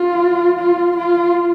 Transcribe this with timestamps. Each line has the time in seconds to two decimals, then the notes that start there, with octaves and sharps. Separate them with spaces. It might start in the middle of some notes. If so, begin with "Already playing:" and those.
Already playing: F4
0.59 F4
0.97 F4